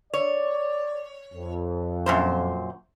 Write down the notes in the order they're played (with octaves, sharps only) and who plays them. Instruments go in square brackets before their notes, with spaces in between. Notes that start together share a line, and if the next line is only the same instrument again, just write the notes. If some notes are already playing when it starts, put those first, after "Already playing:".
[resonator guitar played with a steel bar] C#5 [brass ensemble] D5
[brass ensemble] F2
[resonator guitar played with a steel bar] F#2 A#2 C5